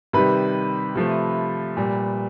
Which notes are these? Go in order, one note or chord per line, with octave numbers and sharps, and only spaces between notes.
C3 D#3 G3 B4
C3 F3 A3
A#2 G3